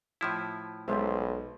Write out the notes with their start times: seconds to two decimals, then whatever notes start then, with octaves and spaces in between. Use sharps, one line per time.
0.21 A2 F3 E4
0.88 B1 G#3 C5 E5